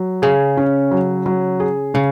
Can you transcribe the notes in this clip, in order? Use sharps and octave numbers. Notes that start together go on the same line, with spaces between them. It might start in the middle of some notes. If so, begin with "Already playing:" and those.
Already playing: F#3
C#3 G#4
C#4
F#3
F#3
G#4
C#3 C#4